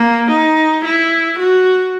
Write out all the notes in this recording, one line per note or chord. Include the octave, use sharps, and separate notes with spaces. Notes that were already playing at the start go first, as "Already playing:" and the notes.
Already playing: A#3
D#4
E4
F#4